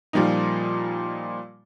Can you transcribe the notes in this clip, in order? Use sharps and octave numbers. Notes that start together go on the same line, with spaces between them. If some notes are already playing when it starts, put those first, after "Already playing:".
A#2 F3 G3 A#3 D#4